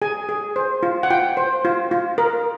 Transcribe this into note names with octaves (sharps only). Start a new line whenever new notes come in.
G#4 G#5
G#4
C5
F4
F#5
F4 G5
C5
F4
F4
A#4